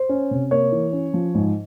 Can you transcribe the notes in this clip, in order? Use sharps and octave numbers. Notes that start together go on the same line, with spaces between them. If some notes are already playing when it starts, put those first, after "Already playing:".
Already playing: C5
C#4
C3
A#3 C#5
E3
C#4
F3
G#2